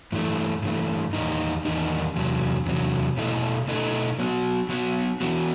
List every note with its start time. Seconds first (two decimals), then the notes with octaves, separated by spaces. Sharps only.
0.12 G2 E3 A3
0.62 G2 E3 A3
1.13 E2 D#3 G3 D#4
1.65 E2 D#3 G3 D#4
2.16 E2 C3 F#3
2.66 E2 C3 F#3
3.17 B2 A3 E4 A4 D#5
3.68 B2 A3 E4 A4 D#5
4.19 F#3 B3 F#4
4.69 F#3 B3 F#4
5.21 E3 B3 F#4